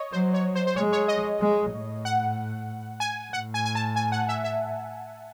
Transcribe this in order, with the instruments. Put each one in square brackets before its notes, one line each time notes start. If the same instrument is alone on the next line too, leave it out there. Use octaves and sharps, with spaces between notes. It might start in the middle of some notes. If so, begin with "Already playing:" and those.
Already playing: [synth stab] C#5 D#5
[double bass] F#3 [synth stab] C5
[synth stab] C#5
C5
C5
[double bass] G#3 [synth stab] C#5
[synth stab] C#5
D#5
[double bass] G#3
A2
[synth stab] F#5
G#5
[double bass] A2 [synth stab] F#5
[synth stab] G#5
G#5
A5
G#5
F#5
E5
E5